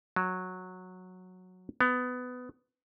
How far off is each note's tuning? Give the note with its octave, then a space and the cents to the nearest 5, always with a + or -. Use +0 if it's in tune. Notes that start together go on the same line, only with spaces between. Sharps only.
F#3 -10
B3 +20